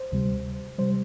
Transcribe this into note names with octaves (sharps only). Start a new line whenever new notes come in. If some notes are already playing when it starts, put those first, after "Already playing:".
Already playing: C5
D2 C3 G3
C3 G3 C5